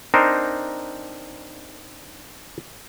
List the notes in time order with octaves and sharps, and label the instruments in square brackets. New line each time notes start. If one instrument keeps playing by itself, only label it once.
[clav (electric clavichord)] C4 D4 D#4 A#4 C5